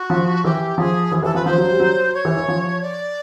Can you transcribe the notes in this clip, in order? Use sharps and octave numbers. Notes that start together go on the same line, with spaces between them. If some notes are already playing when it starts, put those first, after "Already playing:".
Already playing: F#4
F3
E3 G4
F3 G#4
E3
E3 A4
F3 B4
F3 C5
F#3
G3
F#3
C#5
E3
E3
F3
D5